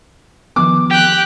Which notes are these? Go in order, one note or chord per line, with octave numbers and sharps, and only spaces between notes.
D#3 F3 B3 D6
G4 G5 F#6